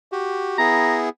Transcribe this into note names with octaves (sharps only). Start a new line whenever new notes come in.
F#4 G4
B3 E4 G#4 A#5